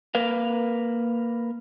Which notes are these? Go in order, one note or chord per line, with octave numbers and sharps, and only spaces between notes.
A#3 A#4 B4 F5